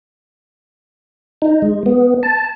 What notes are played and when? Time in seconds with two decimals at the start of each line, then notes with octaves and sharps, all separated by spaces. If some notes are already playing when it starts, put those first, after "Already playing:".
1.42 D#4
1.62 G#3
1.86 B3
2.23 A5